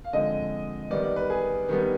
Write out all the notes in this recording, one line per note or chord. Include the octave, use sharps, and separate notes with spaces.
F5
D3 F3 G#3 C4 D#5
D#3 G3 B3 D5
D5
B4
G#4
D#3 G3 B3